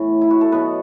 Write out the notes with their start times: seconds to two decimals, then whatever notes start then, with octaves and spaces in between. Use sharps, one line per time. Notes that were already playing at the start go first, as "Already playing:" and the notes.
Already playing: A2 E3 B3 C#5
0.21 E4
0.31 F#4
0.41 A4
0.52 B2 F#3 B3 B4